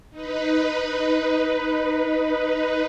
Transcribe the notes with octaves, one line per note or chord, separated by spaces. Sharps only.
D#4 B4